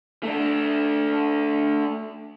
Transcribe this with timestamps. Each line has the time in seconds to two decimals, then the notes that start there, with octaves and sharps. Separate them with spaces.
0.23 A3 D4